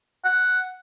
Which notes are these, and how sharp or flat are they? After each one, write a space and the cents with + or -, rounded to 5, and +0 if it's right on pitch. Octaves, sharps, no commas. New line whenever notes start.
F#5 +0